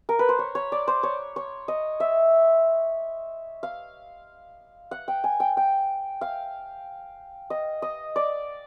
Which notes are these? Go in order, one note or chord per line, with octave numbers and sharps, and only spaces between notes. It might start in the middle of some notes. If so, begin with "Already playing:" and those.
A#4
B4
C5
C#5
C#5
D5
C5
C#5
C#5
D#5
E5
F5
F#5
G5
G#5
G5
G5
F5
D#5
D#5
D5